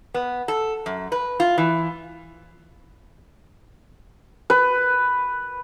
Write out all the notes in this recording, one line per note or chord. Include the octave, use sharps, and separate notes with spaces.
B3
A4
F#2
B4
F4
E3
B4